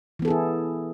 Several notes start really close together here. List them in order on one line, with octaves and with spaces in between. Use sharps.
E3 B3 A4 G#4 E4